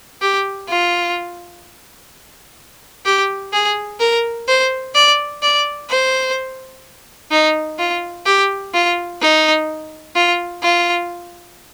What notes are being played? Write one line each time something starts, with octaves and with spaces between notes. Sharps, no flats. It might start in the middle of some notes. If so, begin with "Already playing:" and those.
G4
F4
G4
G#4
A#4
C5
D5
D5
C5
D#4
F4
G4
F4
D#4
F4
F4